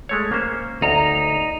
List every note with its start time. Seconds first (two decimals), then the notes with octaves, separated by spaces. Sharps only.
0.09 G#3 A3 C#5
0.32 A#3 C#4 C5
0.82 D2 D#4 A#5